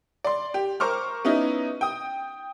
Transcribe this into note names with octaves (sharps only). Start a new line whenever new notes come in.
D5 C6
G4
A#4 C5 C#6 D6 F6
B3 C#4 D#4 E4
G5 D#6